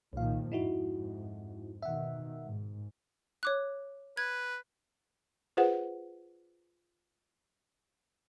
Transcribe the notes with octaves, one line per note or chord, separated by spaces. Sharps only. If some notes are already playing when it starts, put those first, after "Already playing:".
C2 A#2 D#3 F3 F5
F2 G#2 D#4 E4 F#4
B2 D#3 E5 F#5
G#2
C#5 D6 F#6
B4 G#6
F4 G#4 B4 C5 F#5